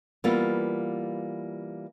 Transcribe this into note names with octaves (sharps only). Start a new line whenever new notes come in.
E3 G3 A#3 B3 F4